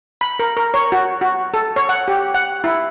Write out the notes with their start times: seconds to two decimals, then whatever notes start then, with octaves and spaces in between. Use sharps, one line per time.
0.21 B5
0.39 A#4
0.57 A#4
0.74 C#5
0.92 F#4
1.21 F#4
1.54 A4
1.76 C#5
1.89 F#5
2.08 G4
2.34 F#5
2.64 E4